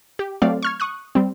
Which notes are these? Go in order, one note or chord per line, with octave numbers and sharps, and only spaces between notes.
G4
F#3 A3 C4 D5 F5
C#6 F6 G#6
C#6 D#6 F#6
G3 C4